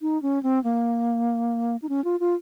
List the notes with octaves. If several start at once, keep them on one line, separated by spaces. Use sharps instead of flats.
D#4
C#4
C4
A#3
D#4
C#4
F4
F4